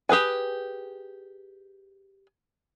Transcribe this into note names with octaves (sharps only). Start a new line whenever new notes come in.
G4 G#4 B4 G#5